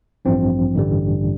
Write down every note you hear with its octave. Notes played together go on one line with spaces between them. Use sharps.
A1 G2 F3 C4
A1 G2 D3 G3